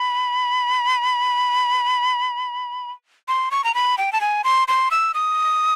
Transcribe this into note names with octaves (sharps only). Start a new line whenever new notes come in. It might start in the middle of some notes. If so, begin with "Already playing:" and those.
Already playing: B5
C6
C#6
A#5
B5
G5
A5
G#5
C6
C6
E6
D#6